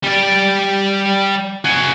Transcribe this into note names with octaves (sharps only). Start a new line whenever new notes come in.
G3 D5
F#4 G#4